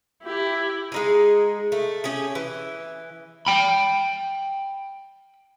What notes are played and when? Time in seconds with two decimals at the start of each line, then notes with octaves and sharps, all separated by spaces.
0.24 E4 G4
0.92 G#3 D#4 G#4
1.72 A3
2.04 C#4 G4 G#4
2.35 E3
3.47 G5 B5